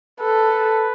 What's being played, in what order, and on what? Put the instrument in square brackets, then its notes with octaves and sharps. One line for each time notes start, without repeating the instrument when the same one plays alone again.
[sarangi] A4 [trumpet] B4